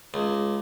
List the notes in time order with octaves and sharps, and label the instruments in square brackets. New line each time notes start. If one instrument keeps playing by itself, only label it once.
[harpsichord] C#2